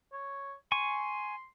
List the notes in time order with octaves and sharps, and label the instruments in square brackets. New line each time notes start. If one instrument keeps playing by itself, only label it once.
[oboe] C#5
[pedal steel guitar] G#5 C#6 [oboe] C6